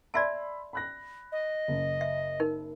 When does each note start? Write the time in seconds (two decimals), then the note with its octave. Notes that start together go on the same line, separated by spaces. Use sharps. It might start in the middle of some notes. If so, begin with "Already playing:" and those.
0.14 D5 E5 A5 B5 C6 E6
0.73 B5 F#6 A#6
1.32 D#5
1.68 F#1
2.01 E5
2.40 D#4 A#4